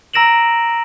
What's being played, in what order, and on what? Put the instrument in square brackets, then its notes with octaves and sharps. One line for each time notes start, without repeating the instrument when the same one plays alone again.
[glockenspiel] A#5 E6 A#6 D7 E7 F#7